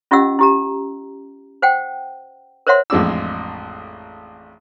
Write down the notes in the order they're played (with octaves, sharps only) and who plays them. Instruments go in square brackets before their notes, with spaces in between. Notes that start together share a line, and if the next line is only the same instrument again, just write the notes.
[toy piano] C#4 F4 G4 D#5 F#5 E6
E4 G4 A#5
C5 F#5 G5
A#4 C5 C#5 E5 F#5 C6
[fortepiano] A1 F2 G#3 D4 D5 E6